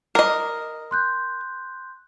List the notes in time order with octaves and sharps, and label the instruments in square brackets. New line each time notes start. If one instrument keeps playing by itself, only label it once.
[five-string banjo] A#4 D#5
[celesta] C6 F#6 G6